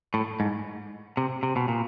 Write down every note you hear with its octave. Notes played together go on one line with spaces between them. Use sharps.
A2
G#2
C3
C3
B2
A#2